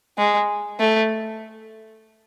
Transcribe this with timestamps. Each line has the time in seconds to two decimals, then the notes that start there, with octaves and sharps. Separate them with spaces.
0.18 G#3
0.80 A3